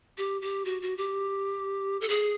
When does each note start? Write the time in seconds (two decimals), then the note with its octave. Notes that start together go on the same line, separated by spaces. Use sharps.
0.18 G4
0.42 G4
0.65 F#4
0.82 F#4
0.97 G4
2.01 A4
2.09 G#4